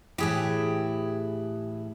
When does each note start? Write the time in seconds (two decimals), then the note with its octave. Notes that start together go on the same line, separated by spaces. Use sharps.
0.18 A2 E3 E4 G4 G#4